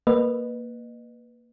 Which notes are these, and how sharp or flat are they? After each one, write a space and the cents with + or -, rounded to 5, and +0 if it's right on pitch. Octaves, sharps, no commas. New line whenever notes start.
A#3 +0 B4 +0 D#5 -25